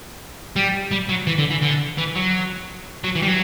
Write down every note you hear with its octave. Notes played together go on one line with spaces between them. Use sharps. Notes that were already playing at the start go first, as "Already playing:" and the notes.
G3
G3
F#3
E3
D3
E3
D3
E3
F#3
F#3
E3
G3
F#3